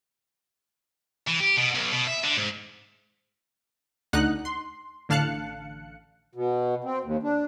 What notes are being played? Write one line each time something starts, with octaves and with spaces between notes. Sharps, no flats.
E3
G4
B2
B1
B2
E5
D3
G#2
D2 D3 D#4 F#5 F#6
C6
A1 D3 F5 A5 F#6 C#7
B2
C4
D#2
D4